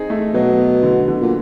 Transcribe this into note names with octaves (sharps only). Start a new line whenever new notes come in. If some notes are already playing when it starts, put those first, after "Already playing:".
Already playing: C4 D#4 G#4
A3
B2 F#3
B3
D3
D3
A#2